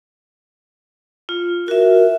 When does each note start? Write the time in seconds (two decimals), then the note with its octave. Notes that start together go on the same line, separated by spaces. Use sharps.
1.29 F4
1.68 F#4 A#4 E5